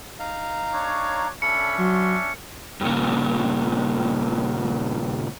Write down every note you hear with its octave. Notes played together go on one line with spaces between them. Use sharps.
D#4 F5 A#5
D4 C#5
C#4 D4 A4 E5 B5 C#7
F#3 F#4 C6
G2 A#2 C#3